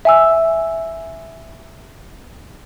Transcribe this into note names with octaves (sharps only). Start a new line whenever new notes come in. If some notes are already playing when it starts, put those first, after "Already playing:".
E5 G#5 E6